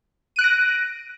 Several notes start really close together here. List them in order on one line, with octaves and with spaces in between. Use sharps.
D#7 F#6 D7 A#6